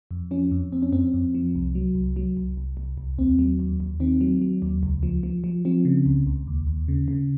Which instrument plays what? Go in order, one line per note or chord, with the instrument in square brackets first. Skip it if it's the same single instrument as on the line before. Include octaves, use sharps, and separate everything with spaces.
[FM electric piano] F2
F3 C#4
F2
F2 C4
C#4
F2 C4
F2
F3
C2
F#3
C2
F#3
C2
C2
C2
C2
D#2 C4
F#3
D#2
D#2
D#3 C4
F#3
F#3
D#2
C#2
F3
F3
F3
F3 C4
C#3
C#2
C#2
D#2
D#2
C#3
C#3